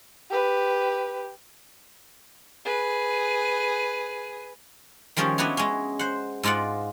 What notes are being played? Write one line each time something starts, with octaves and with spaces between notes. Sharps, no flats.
G4 B4
G#4 B4
D#3 F3 G3 C#4 G#4 C#5
B3 D4 E4 F#4 C#5
G#3 C#4
C5 F#5
G#2 G#3 F4 D5 F#5